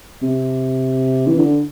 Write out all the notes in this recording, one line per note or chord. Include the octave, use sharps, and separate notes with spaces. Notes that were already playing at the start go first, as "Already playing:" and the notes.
C3
E3
D3